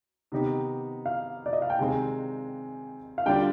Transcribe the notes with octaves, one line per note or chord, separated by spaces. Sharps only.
C3 D#3 B3 D#4 G4
F5
D5
D#5
F5
G5
C3 D#3 G#3 C4 G#5
F5
D3 G3 D4 F4 G5